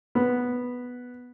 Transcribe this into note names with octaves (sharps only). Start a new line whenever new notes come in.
B3